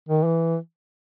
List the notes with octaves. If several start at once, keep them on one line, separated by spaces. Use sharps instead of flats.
D#3
E3